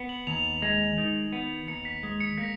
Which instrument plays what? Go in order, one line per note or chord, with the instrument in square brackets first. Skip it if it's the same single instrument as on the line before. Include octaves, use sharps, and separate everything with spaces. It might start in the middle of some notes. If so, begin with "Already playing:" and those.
Already playing: [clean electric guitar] B3
[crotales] F#7
[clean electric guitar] D#2 [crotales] F7
[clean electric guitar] G#3
[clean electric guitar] D#3 [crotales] F7
[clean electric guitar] B3
[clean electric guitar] D#2 [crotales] C#7
[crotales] B6
[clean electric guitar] G#3
[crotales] C#7
[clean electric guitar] A#3 [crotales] B6